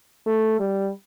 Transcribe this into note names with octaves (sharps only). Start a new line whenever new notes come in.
A3
G3